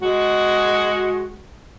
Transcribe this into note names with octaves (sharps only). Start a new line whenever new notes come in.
G#3 F#4